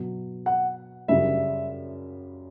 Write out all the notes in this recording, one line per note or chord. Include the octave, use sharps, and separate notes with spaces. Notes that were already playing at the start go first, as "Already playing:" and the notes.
Already playing: B2 F#3 B3
F#5
F#2 C#3 G3 E5